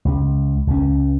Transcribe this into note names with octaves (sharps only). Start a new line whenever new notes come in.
C#2
C#2 C#4